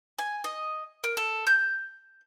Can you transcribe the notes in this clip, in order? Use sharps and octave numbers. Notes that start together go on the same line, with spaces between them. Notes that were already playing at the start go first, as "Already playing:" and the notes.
G#5
D#5
A#4
A4
G6